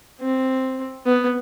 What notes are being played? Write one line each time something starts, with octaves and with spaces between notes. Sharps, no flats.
C4
B3